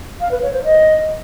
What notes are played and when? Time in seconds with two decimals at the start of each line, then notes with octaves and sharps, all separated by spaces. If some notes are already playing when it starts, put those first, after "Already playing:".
0.20 F5
0.31 B4
0.42 C#5
0.53 C5
0.63 D#5